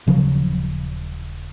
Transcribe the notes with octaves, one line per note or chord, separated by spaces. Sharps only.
D#1 C#3 F3 F#3